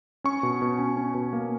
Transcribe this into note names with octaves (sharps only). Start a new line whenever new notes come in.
C#4 C#6
B2
B2
C#4
C#4
B2
A#3